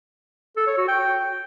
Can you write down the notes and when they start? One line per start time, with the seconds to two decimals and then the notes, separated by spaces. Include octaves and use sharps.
0.57 A4
0.67 C#5
0.78 F#4
0.88 G5